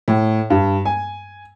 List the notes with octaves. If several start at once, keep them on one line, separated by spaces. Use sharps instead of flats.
A2
G2
G#5